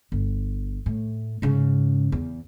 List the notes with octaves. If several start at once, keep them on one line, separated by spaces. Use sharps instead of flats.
G1
A2
G#2 C#3
E2